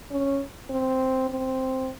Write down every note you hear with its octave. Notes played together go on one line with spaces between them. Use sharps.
C#4
C4
C4